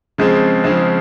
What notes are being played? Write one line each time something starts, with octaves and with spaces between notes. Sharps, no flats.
C#3 F3 G#3 C4
C#3 F3 G#3 C4